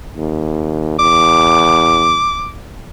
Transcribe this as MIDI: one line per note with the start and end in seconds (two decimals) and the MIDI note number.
0.16 0.97 39
0.99 2.20 40
0.99 2.54 86